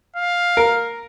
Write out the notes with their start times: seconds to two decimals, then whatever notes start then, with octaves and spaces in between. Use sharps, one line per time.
0.16 F5
0.57 A#4